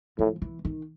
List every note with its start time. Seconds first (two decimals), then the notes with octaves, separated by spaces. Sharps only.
0.19 A2 F3
0.42 E3
0.65 D#3